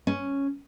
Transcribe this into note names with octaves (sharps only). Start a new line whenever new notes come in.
C#4